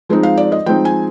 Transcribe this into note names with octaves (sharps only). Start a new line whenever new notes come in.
F3 G#3 C4 D#4
F5
D5
D#5
F3 G#3 C4 D#4 G5
G#5